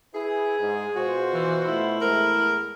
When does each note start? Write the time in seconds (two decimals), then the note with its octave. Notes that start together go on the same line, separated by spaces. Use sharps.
0.14 E4 G#4 B4
0.60 G#2 G#3
0.96 B2 F4 F#4 C5
1.34 E3
1.65 A3 E4
2.01 E2 G#3 A#4